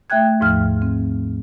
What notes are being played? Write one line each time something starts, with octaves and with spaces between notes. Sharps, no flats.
A3 E5 G5 F#6 G#6
D#2 G#2 F3 F6
C4